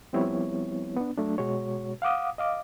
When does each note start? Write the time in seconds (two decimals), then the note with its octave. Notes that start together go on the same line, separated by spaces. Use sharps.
0.13 F3 G3 B3 C4 E4 C#5
0.97 B3 D4
1.18 F#3 A3 D4
1.38 B2 G#3 F#4 C#5
2.02 F5 F#5 D6 D#6
2.38 D#5 F5 D6